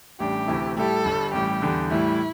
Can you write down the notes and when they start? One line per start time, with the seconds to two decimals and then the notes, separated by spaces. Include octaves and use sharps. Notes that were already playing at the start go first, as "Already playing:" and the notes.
0.20 A1 A2 G3 D4 G4
0.48 D2 C3 E3 A3 E4
0.77 A2 G3 E4 G4 A4
1.05 G1 G2 G3
1.33 A1 A2 G3 G4
1.62 E2 D3 G3
1.90 A2 E3 G3 E4